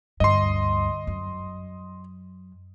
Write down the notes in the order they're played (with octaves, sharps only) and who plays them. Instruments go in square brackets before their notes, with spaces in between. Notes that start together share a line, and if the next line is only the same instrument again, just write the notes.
[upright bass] D2 G2 [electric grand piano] D#5 C6
[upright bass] F#2